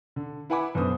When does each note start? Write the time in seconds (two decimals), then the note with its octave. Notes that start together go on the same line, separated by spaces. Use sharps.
0.16 D3
0.50 E4 B4 F#5 G#5 B5 D6
0.75 F#2 B2 D3 B4 C5 D#6